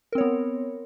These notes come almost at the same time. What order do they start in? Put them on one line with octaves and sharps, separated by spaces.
A#4 C4 C#5 B3